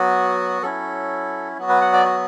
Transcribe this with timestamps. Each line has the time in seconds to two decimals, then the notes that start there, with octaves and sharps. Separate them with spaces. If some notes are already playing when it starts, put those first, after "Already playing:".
Already playing: F#3 B3 F#4
0.62 F#3 C#4 E4 A4
1.57 F#3 B3 F#4
1.69 B4
1.81 F#5
1.93 D5
2.05 F#4